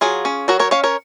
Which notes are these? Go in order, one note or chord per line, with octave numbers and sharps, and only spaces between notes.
F#3 F4 G#4
C#4
F#3 F#4 A#4
A#4 C#5
C#4 C#5 F5
A#4 C#5